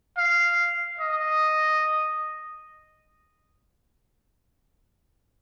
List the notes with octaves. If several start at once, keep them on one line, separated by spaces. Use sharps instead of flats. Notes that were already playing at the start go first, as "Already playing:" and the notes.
F5
D#5